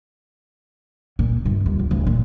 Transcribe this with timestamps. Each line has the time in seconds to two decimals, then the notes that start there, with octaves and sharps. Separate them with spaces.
1.19 A#2
1.45 G1
1.66 D#2
1.79 D#1
1.91 D1
2.07 A#2